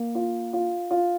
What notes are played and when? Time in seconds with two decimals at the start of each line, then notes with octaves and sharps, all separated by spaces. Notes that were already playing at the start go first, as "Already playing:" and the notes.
Already playing: A#3
0.15 F4
0.53 F4
0.91 F4